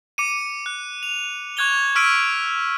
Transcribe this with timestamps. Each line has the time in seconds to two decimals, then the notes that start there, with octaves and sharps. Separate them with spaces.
0.18 D6 C#7 D#7
0.66 F#6
1.03 F7
1.57 C#6 F#6 G#6 F7 G7
1.95 C#6 E6 F6 B6 D7 D#7